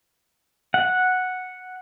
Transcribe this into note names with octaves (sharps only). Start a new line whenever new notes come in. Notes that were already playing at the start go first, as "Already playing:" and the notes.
F#5